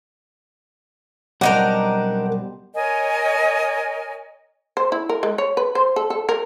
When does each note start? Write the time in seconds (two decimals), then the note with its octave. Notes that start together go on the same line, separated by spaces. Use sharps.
1.41 B1 G3 C4 D4 D#4 A#4 F#5
2.74 A#4 C#5 D#5 G#5
4.77 C5
4.92 E4
5.09 A#4
5.23 G#3
5.38 C#5
5.57 B4
5.75 C5
5.96 A4
6.10 A4
6.29 A#4